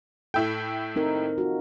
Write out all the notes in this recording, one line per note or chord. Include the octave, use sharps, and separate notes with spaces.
A2 E4 A4 G5
C4 D#4 A#4
F4 F#4